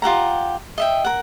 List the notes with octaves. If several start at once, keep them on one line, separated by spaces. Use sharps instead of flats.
F4 G4 F#5 A#5
D#5 E5 G5
A#4 F#5